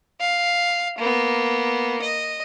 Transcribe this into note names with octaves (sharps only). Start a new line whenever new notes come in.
F5
A#3 B3
D#5